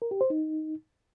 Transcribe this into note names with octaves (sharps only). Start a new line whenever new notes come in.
A#4
G4
C5
D#4